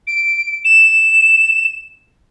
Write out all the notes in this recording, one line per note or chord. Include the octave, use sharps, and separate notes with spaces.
D7
E7